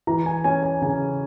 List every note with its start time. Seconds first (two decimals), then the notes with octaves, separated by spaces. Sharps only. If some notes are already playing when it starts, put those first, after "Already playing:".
0.07 E3 A#5
0.26 G#5
0.44 C#4 G#5
0.63 G#5
0.82 C#3 G#5